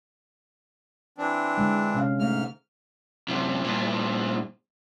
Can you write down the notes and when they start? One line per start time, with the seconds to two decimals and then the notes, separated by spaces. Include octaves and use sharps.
1.18 E3 C4 D4
1.58 D3 G#3
1.94 C3 C#4 F5
2.20 G#2 A3 F5 F6
3.28 F#2 C3
3.64 G2 A#2